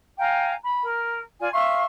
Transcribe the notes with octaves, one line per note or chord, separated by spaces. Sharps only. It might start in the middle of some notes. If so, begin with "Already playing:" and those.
F5 G5 G#5 A#5
B5
A#4
F4 D5 G#5
E5 F5 C6 C#6